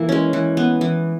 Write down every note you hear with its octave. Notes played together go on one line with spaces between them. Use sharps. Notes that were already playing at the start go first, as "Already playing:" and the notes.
Already playing: E3 A#3 E4
G#3 C#4
E3
B3
E3